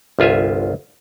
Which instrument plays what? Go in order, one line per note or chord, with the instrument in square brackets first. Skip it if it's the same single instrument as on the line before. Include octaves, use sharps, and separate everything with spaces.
[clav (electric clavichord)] G1 C2 F4 E5 G#5